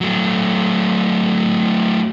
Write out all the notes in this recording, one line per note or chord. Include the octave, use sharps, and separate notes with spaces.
F#3 A3